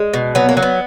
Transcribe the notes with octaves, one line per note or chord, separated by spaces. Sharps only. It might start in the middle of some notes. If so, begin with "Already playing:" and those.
Already playing: G#3
B2
F#3 B3
A#3
F#3
B3